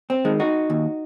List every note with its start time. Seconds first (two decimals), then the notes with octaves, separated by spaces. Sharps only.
0.10 C4
0.25 D#3 G#3
0.40 D#4 F#4
0.70 D#2